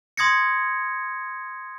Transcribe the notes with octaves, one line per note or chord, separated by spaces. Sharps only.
C6 D#6 G#6 A#6 C#7